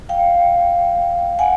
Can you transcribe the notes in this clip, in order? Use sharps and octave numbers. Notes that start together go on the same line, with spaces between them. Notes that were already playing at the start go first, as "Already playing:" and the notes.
F5 G5
F#5 G#5